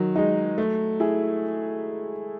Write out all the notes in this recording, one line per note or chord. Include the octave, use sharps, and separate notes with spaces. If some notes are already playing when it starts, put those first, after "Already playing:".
Already playing: D#3 F#3
G#3 D#4
A3
E4 G#4